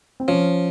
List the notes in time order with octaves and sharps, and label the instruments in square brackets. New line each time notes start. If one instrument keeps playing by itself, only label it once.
[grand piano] C4
[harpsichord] F3 [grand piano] C#4